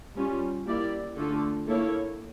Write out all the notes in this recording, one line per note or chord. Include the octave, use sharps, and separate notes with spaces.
G3 C#4 F4
A#3 E4 G4 D5
D3 A3 D4 F4 A4
A#3 E4 A4 C#5